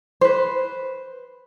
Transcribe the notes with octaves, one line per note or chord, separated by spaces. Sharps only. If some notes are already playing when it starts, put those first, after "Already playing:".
B4 C5